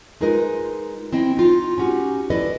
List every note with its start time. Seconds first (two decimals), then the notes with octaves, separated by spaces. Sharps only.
0.21 G#3 D#4 F4 A#4 B4 D#5
1.12 C4 E4 D#5 G5
1.37 D#4 F4
1.78 C#4 D#4 F#4 G4
2.30 E4 A4 B4 D5 D#5